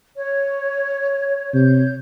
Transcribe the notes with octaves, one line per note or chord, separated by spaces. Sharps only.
C#5
C3 C#5 G6